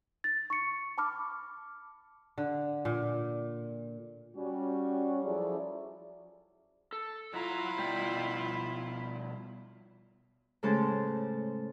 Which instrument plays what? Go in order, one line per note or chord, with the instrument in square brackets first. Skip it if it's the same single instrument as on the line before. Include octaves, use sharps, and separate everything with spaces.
[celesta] A6
C#6 C#7
A5 B5 D6 F6
[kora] D3
A#2
[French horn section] G3 C#4 F#4
F3 F#3 E4 G#4 A4 D5
[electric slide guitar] A4
[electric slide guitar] F#3 A#5 [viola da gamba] E4 F4
[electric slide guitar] B2 G3 G5
[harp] A2 C#3 G#3 A4 C5 A5